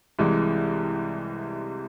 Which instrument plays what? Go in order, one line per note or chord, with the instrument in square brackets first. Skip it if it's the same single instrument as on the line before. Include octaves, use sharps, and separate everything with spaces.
[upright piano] C2 C3 E3 G#3